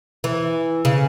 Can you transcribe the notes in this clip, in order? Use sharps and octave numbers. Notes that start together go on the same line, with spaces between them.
E3
C#3